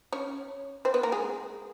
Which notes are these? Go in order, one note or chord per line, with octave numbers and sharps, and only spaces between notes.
C#4 C#5
C4 C5
B3 B4
A#3 A#4
G#3 G#4